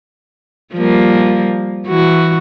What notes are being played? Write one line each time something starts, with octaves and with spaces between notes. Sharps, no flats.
F3 G3 A#3
E3 F#4